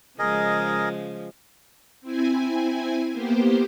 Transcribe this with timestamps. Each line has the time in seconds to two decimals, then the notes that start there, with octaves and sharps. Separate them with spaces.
0.19 C#3 F3 G#3 G#4 A#4 D#5
2.01 C4 E4 G#5
3.12 A#3 B3 G4 C5